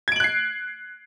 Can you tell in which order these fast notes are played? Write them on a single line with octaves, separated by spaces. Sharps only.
G#6 D7 F#7 F#6 C7